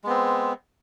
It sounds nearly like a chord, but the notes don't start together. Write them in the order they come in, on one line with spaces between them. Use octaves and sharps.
G#3 B3 C4